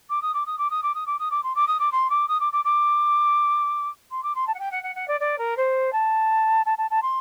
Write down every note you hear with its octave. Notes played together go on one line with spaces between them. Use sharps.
D6
D#6
D6
D#6
D6
D#6
D6
D#6
D6
D#6
D6
C6
D6
D#6
D6
C6
D6
D#6
D6
D6
D6
C6
D6
C6
A5
F#5
G5
F#5
F#5
F#5
D5
D5
A#4
C5
A5
A5
A5
A5
C6